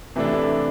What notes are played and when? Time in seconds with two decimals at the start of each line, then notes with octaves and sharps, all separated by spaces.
0.16 C3 E3 A3 D4 A4